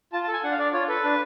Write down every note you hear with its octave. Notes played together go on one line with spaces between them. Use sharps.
F4 A5
A5
A4
G#5
D4 F#5
F5
D4 D5
F4 C#5
A4 B4
D4